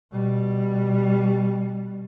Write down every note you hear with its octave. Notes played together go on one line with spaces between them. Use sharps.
B2 G3